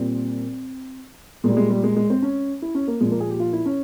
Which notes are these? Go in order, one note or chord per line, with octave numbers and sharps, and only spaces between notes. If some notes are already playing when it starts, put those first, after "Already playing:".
Already playing: A#2 G3 C4
A#2 G3 G#3
G#3
G3
G#3
G#3
C4
C#4
E4
C#4
A#3
A#2 F3 G#3
A#3
G#4
G4
F4
E4
C#4